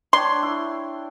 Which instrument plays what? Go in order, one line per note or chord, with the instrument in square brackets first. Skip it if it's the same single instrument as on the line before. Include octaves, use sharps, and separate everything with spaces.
[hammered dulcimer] D4 C#5 G5 [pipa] C6
[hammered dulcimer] E4